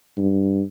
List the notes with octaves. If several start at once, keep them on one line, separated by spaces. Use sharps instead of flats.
G2